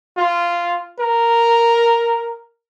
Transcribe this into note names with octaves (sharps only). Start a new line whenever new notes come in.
F4
A#4